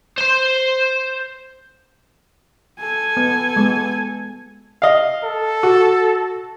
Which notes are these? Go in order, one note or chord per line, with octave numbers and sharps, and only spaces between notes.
C5 C6
A4 G#5
B3
G#3 B3
D#5 F5
A4
F#4